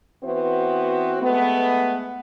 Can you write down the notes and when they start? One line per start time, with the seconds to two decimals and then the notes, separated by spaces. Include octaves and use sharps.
0.23 E3 B3 C4 F#4 C5
1.22 G#3 A3 B3